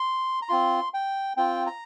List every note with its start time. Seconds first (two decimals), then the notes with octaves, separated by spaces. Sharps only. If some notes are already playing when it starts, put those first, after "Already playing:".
Already playing: C6
0.42 A#5
0.49 C4 F4 C6
0.94 G5
1.37 C4 F4 G5
1.67 A#5